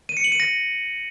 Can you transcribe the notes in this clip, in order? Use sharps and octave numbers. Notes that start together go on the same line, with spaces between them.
D#7
C#7
F#7
D#7
A#6